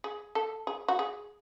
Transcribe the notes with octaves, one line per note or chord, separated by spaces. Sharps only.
G#4
A4
G#4
F#4
G#4